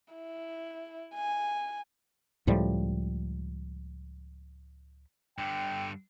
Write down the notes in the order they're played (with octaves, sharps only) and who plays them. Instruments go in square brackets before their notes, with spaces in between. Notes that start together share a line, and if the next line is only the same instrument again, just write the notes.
[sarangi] E4
G#5
[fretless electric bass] C#2 A2 F3 G3
[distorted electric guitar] G2 D3 [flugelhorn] G5